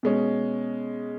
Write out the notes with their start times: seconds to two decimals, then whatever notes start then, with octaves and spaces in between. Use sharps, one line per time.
0.03 B2 G#3 C#4